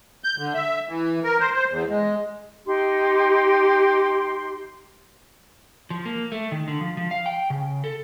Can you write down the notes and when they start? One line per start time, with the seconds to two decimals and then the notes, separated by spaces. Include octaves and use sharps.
0.24 G6
0.38 D3
0.54 E5
0.89 E3
1.24 A#4
1.40 C5
1.55 C5
1.70 E2
1.89 G#3
2.66 D#4 G4 C6
5.90 F3
6.05 A#3
6.32 A3
6.52 D#3
6.68 D3
6.81 F3
6.97 F3
7.11 F5
7.26 G5
7.50 C#3
7.84 A4